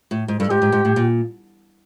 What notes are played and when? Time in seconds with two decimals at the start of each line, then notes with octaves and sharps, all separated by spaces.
0.11 A2
0.28 G#2
0.39 G2 A4
0.50 G#2 G4
0.62 G#2
0.72 G#2
0.85 A2
0.96 A#2